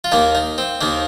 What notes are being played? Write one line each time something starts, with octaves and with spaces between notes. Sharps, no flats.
F4
D#2 D#3 A#3 D#4
D#4
C4
D#2 D#3 A#3 D#4